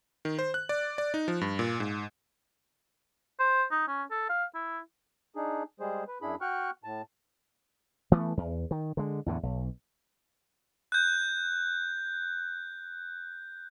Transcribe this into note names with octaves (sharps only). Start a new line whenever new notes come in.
D#3
C5
F#6
D5
D5
D#4
F3
G2
A#2
G#2
C5
D#4
C#4
A4
F5
E4
D4 D#4 G#4
G3 G#3 G#4 C5
B4
F#2 D4 E4 G#4 B5
F#4 G5 C#6 F6 F#6
A2 A5
E3 A3 B3
E2
D#3
D3 G#3
E2 A2 D3
B1
F#6 G6